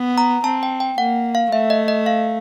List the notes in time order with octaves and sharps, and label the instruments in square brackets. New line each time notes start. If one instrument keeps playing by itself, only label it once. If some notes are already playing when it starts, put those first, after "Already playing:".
Already playing: [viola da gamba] B3
[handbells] A#5
[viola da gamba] C4 [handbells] A5
[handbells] G5
G5
[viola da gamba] A#3 [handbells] F#5
[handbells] F5
[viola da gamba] A3 [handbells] E5
[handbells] D#5
D#5
F5